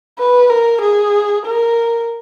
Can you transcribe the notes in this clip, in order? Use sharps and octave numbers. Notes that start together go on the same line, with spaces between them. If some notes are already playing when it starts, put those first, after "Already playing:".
B4
A#4
G#4
A#4